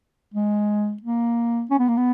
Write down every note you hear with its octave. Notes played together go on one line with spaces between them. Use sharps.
G#3
A#3
C#4
B3
A#3
B3